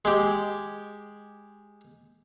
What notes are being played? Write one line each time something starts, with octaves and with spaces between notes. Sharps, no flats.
G#3 G4